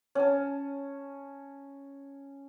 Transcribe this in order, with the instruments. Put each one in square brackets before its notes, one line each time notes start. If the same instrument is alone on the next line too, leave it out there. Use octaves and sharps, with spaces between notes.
[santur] C#4 A5